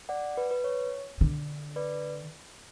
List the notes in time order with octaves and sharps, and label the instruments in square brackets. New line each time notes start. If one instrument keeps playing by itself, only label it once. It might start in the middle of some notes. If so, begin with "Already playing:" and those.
[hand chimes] D5 F#5
B4
B4
C#5
[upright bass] D3
[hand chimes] B4 D5